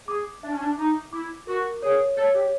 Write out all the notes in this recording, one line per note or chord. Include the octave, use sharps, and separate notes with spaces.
G#4 D6
D4 E5
C#4
D4
D#4 D6
E4 D6
F#4 A#4
G#4 C#5
A4 C#5
G4